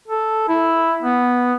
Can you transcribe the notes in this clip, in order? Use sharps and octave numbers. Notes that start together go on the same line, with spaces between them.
A4
E4
B3